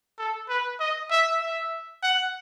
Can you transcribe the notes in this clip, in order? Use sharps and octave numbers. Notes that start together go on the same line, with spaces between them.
A4
B4
D#5
E5
E5
F#5